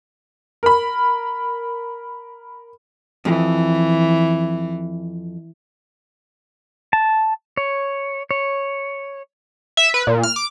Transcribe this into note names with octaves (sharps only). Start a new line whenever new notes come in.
A#4 B5
F2 E3
A5
C#5
C#5
E5
B4
A#2
F6
D6